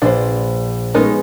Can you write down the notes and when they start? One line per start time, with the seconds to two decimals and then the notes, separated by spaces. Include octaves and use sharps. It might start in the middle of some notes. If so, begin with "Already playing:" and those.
0.02 A#1 D4 B4 C5
0.94 G#3 A3 B3 C#4 D#4 A#4